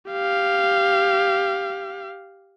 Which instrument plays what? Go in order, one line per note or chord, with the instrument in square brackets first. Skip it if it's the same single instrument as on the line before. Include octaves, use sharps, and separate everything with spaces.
[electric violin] G4 F5